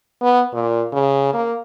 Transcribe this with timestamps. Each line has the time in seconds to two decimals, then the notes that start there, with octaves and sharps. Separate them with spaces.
0.22 B3
0.53 A#2
0.92 C#3
1.33 A#3